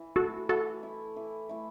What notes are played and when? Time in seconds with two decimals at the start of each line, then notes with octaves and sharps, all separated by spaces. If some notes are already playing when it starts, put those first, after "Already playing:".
Already playing: E3
0.16 A3 E4 F#4 A4
0.49 E3 F#4 A4
0.83 A3 E4
1.16 E3
1.49 A3 E4